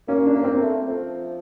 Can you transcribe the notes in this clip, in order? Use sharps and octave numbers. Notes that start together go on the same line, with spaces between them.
A#3 C#4
D4
A#3
C4
A3
F3